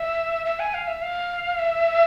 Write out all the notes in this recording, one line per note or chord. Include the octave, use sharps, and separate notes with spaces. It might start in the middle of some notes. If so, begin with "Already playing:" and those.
Already playing: E5
E5
G#5
F5
E5
F5
E5